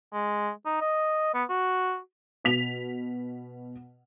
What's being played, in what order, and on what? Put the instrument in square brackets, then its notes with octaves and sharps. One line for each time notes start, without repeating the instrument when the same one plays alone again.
[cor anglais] G#3
D#4
D#5
B3
F#4
[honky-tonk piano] B2 B6 F7